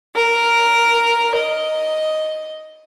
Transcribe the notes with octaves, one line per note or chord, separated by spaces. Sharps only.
A#4
D#5